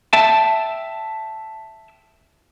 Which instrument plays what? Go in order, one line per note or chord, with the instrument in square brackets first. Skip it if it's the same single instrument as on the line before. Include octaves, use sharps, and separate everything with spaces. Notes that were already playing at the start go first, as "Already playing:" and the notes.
[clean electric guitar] E5 G5 A5